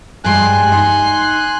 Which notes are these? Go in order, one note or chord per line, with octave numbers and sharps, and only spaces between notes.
G2 G3 G#3 G#5 C6 F#6
D#4 C6